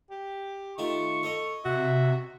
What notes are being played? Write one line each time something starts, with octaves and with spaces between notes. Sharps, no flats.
G4
D#3 A3 F4 C#6
A4 C#5 D#5
C3 F#4 E5